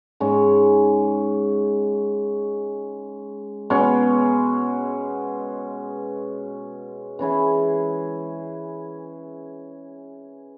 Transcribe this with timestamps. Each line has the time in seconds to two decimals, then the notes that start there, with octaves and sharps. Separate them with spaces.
0.20 G#2 G#3 C#4
3.70 B2 G#3 C#4
7.19 E3 C#4 E4 G#4